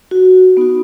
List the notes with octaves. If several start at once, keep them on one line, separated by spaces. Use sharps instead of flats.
F#4
B3 D#4 F#4